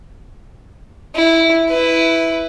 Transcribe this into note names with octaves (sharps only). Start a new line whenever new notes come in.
E4
E4 B4